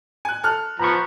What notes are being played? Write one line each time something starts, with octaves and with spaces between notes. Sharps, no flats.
G#5 F#6
A4 F6 F#6
F3 B3 A#5 B5 C#6